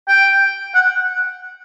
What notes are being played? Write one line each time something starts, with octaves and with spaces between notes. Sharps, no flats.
G5
F#5